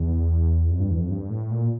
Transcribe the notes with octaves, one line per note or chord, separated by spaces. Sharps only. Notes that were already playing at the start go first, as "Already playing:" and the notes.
Already playing: E2
F2
G2
E2
F2
G2
A2
A#2